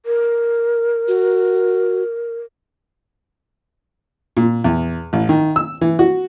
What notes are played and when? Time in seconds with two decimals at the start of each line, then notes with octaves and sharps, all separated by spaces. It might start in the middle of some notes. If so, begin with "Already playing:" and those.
0.06 A#4
1.08 F#4
4.37 A#2
4.64 E2
5.13 A1
5.29 D#3
5.56 E6
5.81 E3
5.99 F#4